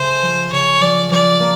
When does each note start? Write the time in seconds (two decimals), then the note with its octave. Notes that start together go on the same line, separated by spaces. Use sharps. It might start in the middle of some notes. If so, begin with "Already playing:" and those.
Already playing: C#3 A3 C5
0.22 F3
0.52 C#3 C#5
0.82 F3 D5
1.11 F3 D5
1.40 A#3